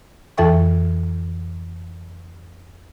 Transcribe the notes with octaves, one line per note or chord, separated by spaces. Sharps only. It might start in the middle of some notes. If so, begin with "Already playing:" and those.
F2 E3 A4 E5 G5 C#6